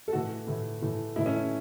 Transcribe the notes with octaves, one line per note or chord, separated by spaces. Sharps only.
A4
A2 E3 A3 F#4
A2 E3 A3
A2 E3 A3
A2 E3 A3 E4
C#4